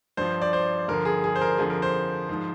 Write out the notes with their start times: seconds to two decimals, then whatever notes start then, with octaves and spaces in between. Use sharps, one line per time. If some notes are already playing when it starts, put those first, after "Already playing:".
0.17 G2 F3 C5
0.42 D5
0.53 C5
0.88 G2 D3 F3 A#4
1.05 G#4
1.24 G#4
1.36 C5
1.41 A#4
1.58 F2 D3 F3 G#4
1.70 A#4
1.82 C5
2.29 G#2 F3